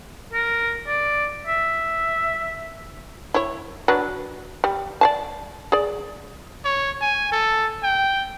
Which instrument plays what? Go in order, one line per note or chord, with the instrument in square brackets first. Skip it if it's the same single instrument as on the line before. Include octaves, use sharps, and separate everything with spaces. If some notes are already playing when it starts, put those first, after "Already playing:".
[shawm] A#4
D5
E5
[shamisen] E4 C#5
F#3 D4 B4
G3
D5 F5 A5
G#4 D5
[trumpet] C#5
G#5
A4
G5